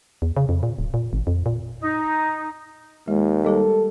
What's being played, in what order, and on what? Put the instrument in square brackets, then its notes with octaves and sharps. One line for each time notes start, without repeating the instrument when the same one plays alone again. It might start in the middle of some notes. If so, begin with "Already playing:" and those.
[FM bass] E2
C#3
F2
A#2
D1
A#2
G#1
F2
A#2
[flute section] D#4
[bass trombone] D#2 [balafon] G#3
[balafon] G3 G4 A#4 [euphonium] A4